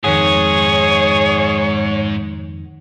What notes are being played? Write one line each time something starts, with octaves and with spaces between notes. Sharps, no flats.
F2 G#2 D#3 G#4 C#5 F#5